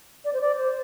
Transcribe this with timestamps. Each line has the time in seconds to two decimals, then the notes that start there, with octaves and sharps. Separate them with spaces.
0.25 D5
0.33 C5
0.41 D5
0.57 C5